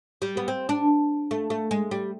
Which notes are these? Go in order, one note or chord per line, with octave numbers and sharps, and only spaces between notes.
G3
B3
C4
D4
A3
A3
G#3
G3